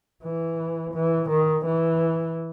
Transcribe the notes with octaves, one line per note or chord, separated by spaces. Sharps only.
E3
E3
D#3
E3